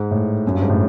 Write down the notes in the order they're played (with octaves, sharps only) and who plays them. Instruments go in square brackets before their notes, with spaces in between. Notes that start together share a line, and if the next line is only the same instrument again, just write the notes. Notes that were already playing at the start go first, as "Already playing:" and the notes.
Already playing: [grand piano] G#2
A2
F#2
G2
G#2
A2